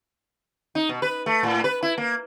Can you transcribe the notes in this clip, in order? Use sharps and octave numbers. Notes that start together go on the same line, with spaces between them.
D#4
B2
B4
A3
A2
B4
E4
A#3